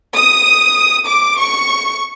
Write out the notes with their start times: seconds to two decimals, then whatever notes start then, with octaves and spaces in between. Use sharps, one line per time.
0.15 D#6
1.07 D6
1.38 C#6